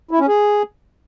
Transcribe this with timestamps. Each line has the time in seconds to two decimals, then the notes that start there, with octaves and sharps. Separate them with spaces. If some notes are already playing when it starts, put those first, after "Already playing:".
0.11 E4
0.20 C#4
0.28 G#4